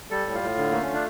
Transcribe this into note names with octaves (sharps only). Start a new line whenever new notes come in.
G3 A4
A2
F4
A2
D3
A3 A#3
C#4
D4